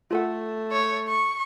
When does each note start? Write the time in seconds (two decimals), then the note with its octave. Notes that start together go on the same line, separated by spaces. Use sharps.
0.11 A3 F4 A4 F#5
0.72 C#5
1.08 C#6